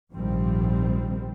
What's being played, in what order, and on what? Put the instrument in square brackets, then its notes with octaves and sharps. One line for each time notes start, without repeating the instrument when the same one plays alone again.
[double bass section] A#1 G#2 D#3 F3 G3 C4